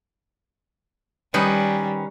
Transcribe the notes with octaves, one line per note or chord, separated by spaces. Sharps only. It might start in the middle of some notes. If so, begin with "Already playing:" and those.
D#3 G3 C#4 B4